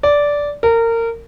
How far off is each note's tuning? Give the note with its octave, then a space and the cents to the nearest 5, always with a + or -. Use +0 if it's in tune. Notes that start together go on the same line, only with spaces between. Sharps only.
D5 -10
A#4 -25